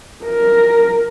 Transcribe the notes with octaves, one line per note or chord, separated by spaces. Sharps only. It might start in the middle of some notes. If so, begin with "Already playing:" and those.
A#4